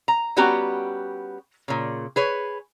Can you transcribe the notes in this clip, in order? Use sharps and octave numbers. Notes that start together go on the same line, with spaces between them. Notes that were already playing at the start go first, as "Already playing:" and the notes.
A#5
G3 B3 C#4 F#4 G4 A#5
A#2 C#3
G#4 B4 C#5